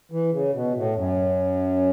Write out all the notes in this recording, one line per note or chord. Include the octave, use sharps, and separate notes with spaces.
E3
C#3
B2
A2
F#2